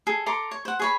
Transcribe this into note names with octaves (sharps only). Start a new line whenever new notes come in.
G#4 A4
A4 A#5 C6 D6
C#5
C5 F#5
G#4 C#5 B5